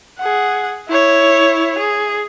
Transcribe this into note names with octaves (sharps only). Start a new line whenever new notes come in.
G#4 F#5
E4 C#5
G#4